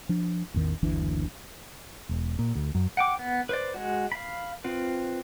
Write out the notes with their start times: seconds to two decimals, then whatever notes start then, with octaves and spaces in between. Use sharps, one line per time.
0.09 F3 D4
0.54 A1 E2 D#3
0.83 F#1 D2 E3 D4
2.09 E1
2.39 A#2
2.55 D2
2.75 F#2
2.97 F#5 G5 D6
3.19 B3
3.49 B4 C5 D5
3.74 G#3 F#4
4.12 F5 B5
4.64 C4 F4 B4